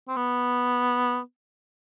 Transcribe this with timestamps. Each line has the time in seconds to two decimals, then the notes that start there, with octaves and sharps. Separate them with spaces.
0.08 C4
0.16 B3